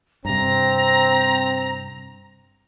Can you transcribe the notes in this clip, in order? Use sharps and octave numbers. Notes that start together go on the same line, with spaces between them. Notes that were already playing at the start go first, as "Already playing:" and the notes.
G2 C3 C4 A#5